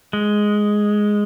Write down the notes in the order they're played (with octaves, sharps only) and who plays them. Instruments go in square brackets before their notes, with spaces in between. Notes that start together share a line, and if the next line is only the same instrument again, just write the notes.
[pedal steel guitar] G#3